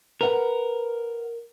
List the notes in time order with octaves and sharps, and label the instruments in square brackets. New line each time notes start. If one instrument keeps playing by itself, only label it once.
[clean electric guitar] A#4 [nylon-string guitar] B4 F#5